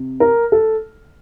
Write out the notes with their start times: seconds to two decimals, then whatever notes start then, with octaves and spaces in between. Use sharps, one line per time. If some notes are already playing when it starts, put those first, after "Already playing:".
Already playing: C3
0.20 A#4
0.52 A4